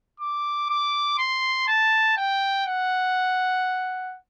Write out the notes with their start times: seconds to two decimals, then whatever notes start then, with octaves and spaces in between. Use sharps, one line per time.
0.20 D6
0.70 D6
1.18 C6
1.67 A5
2.17 G5
2.66 F#5